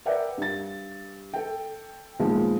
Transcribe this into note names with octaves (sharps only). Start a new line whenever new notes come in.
A#4 B4 D5 E5 F#5 G5
G2 A6
A4 G5
A#2 D#3 F3 G#3 B3